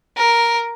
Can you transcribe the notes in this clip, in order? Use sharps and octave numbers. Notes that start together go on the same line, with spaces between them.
A#4